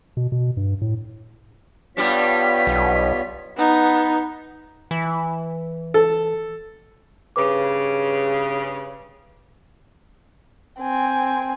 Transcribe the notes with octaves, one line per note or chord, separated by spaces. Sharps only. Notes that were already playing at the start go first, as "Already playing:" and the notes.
B2
B2
G2
A2
G2 G3 B3 F4 G4 C#5 B6
B1
B3 D#4
E3
A4
G2 C#3 B4 D6
C4 G#5